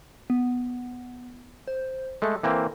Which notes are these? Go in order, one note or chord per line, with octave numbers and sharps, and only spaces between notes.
B3
C5
G#3 A3 A4
E3 A#3 C4